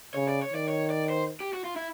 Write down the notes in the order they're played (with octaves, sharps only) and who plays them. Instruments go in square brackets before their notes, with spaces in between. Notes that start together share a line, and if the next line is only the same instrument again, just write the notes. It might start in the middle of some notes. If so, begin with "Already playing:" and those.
[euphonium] C#3 [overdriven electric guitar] C#5
[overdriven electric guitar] D5
C#5
[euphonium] D#3 [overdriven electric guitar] D5
[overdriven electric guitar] C#5
D5
C5
G4
F#4
F4
E4